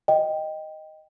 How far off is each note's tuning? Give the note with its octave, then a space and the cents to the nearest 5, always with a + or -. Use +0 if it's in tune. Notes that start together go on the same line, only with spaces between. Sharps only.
D#5 +0 G5 +0